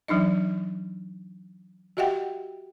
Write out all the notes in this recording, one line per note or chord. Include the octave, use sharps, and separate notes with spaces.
E3 F#3 D4 D#4 D#5
F#4 G4 D#5 E5 F#5 G5